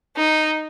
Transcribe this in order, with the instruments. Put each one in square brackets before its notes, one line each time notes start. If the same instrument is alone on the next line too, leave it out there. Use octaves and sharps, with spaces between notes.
[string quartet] D#4